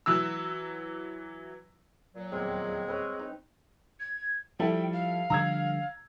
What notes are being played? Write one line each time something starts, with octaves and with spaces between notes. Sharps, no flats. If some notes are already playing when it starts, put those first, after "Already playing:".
E3 F#3 E6
A#2 F#3
D#1 E2 G#3 C4 G5
C4 B4 C#5
D#4
G#6
F3 G3 E4 A4 G5
F5
D3 F3 G3 A#5 E6 G#6